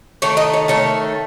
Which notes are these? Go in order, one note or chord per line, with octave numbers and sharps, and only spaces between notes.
D#3 A3 C#5
D#5
C#5
D#3 A3 C#5